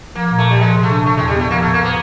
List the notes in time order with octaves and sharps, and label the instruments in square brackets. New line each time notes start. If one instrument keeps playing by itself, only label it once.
[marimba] F3 [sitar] A#3
[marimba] A#2
[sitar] A3
[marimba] A#2
[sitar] G3
[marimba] F3 [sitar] G#3
[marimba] C3
[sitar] A3
[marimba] D4
[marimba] C#3 [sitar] A3
[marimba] E2 [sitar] G#3
[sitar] G3
[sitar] A3 [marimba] B3
[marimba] F3 [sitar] A#3
[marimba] A2 [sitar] A3
[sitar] A#3
[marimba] A2 [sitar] B3